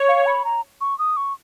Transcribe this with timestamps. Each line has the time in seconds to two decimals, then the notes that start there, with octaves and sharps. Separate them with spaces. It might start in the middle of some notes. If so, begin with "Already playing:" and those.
Already playing: C#5
0.08 F5
0.26 B5
0.45 A#5
0.81 C#6
0.99 D#6
1.17 C#6